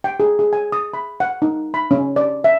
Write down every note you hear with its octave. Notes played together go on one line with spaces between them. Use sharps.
G5
G#4
G#4
G#5
D#6
B5
F#5
D#4
B5
C#4
D5
E5